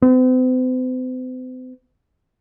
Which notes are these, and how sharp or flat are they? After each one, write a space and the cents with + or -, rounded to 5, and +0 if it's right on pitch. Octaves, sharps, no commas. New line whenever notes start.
C4 -45